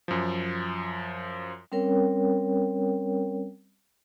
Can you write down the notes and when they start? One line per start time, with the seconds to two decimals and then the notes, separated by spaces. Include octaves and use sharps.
0.08 F#2 F3
1.72 G3 C4 C#4 A#4 C#5 G5